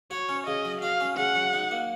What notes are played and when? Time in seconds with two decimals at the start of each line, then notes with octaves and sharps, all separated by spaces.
0.11 F#4 C#5
0.29 C#4
0.47 C#3 D#5
0.65 F#3
0.82 F#4 F5
1.00 C#4
1.18 C#3 F#5
1.35 F#3
1.53 D#4
1.71 A#3